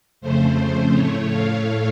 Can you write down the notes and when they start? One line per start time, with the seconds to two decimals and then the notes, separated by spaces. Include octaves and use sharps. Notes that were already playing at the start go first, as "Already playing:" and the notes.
0.21 F2 C#3 A3 C5
0.92 A2 A3 C#5
1.28 F5